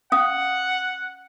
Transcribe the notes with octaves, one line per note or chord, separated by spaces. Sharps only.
C#4 F5 F#5 D#6